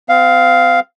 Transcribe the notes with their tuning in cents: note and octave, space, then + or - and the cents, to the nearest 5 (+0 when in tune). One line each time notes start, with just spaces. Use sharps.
C4 -40 F5 +0